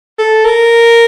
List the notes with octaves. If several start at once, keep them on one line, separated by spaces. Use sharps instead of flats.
A4
A#4